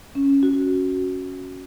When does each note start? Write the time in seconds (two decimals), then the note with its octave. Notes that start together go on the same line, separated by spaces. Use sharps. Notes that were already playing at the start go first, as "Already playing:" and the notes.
0.15 C#4
0.43 F#4